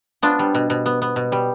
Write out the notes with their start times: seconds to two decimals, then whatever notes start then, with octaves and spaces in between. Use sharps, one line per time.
0.22 B3 D4 F4
0.39 G3
0.55 B2
0.70 B2
0.86 B3
1.02 B3
1.16 B2
1.32 G3